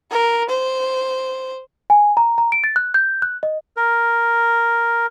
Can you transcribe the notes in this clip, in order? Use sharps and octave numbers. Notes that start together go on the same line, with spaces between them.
A#4
C5
G#5
A#5
A#5
D7
A6
F#6
G6
F#6
D#5
A#4